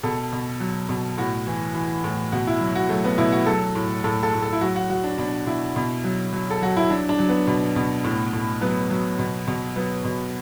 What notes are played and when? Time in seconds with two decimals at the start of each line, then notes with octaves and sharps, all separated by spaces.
0.03 B2 A4
0.32 B2
0.60 F#3
0.89 B2
1.18 A2 F#4
1.47 E3
1.75 E3
2.04 A2
2.32 B2 F#4
2.47 E4
2.61 F#3
2.75 F#4
2.89 F#3 A3
3.04 B3
3.18 B2 E4
3.32 F#4
3.46 F#3 A4
3.75 A2
4.04 A2 A4
4.23 A4
4.33 A2
4.42 A4
4.53 E4
4.61 F#3 F#4
4.76 F#4
4.90 F#3 F#4
5.04 D4
5.18 B2 D4
5.47 B2 E4
5.76 B2
6.04 F#3
6.33 F#3
6.50 A4
6.61 F#3 F#4
6.77 E4
6.90 F#3 D4
7.09 D4
7.19 F#3
7.29 B3
7.47 B2
7.76 B2
8.04 A2
8.33 A2
8.61 F#3 B3
8.90 F#3
9.19 B2
9.47 B2
9.76 F#3 B3
10.04 B2